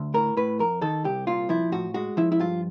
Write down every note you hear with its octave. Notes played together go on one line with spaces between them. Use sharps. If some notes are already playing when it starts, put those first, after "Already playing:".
Already playing: D2
A2 A#4
A2 B4
F2 A#4
D#3 A4
C2 G4
A#2 F4
F3 E4
A2 F#4
G#3 F#4
F3 E4
E4
G2 F4